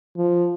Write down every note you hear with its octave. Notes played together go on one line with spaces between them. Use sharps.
F3